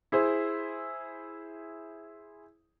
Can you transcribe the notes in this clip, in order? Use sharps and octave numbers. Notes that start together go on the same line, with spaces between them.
E4 G#4 C5